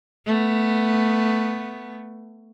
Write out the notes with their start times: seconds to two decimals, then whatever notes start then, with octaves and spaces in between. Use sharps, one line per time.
0.26 A3 B3